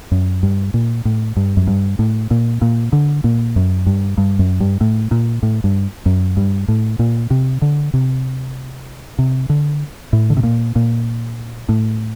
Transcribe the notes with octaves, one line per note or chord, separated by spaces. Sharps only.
F#2
G2
A#2
A2
G2
F#2
G2
A2
A#2
A#2
D3
A#2
F#2
G2
G2
F#2
G2
A2
A#2
A2
G2
F#2
G2
A2
A#2
C3
D3
C3
C3
D3
A2
D3
C3
A#2
A#2
A2